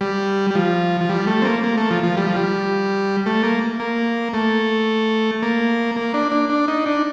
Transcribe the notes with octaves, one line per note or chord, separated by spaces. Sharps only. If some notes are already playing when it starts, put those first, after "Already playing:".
G3
G3
F3
F3
G3
A3
C4
A#3
A#3
A3
F3
F3
G3
F3
G3
A3
A#3
A#3
A3
A#3
A#3
D4
D4
D4
D#4
D4